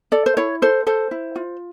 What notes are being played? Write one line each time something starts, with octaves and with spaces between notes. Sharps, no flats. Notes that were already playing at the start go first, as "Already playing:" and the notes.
A4 D5
C5
E4 C#5
A4 C5
A4 C5
E4
F4